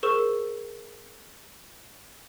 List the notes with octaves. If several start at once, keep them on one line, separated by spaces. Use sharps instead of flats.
G#4 A#4 C5 C#6 E6 E7